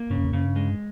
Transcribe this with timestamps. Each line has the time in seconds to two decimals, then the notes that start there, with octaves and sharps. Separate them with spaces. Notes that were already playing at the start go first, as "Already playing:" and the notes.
Already playing: A#3
0.10 G2 C#3
0.18 F#2
0.25 F2
0.32 F#2 C#3
0.44 G2
0.56 G#3